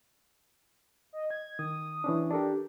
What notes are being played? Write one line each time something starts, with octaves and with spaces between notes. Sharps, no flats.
D#5
G#6
D#3 D#6
E3 C#4 D4
D4 G4 A4 A#4